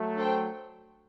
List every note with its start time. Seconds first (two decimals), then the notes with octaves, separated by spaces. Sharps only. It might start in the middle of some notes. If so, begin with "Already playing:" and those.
Already playing: F#3 A3
0.16 D4 A4 C5 G5